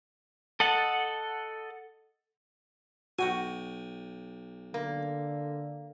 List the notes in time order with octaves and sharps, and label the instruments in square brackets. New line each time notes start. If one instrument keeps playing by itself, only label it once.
[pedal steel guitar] A4 D#5 F#5 A5
[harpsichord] B1 G5 G#5 [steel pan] F#4
[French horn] D3 [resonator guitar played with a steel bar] A#3